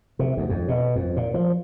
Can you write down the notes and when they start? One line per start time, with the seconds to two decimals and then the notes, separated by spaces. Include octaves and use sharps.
0.19 C3
0.37 D2
0.49 F2
0.68 B2
0.96 F2
1.16 A#2
1.34 F3